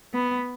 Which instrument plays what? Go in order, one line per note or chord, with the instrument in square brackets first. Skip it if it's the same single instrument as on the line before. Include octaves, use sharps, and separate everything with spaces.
[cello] B3